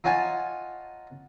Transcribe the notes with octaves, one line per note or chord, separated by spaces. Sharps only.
D#4 F4 C#5 F#5 G#5 A5